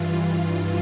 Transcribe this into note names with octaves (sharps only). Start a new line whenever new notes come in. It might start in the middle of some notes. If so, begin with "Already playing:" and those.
Already playing: G2 E3 F4
G2 E3 F4